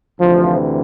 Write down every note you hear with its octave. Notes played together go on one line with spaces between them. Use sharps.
D2 C3 E3 F3